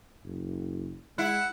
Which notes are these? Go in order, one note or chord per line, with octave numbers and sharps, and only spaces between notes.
F#1
G#3 E4 F#5